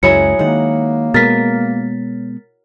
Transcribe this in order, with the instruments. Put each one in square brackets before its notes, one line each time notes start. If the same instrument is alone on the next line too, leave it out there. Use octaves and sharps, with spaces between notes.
[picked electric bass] C#2 F#2 G#3 [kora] F#3 E4 G#4 [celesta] C#7
[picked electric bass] D#3 G#3 [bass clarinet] A#3 [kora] F#5
[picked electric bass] B2 G#3 B3 [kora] A#4 [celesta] A6 B6